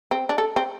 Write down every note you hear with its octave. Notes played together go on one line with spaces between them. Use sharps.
C4
D4
A4
C4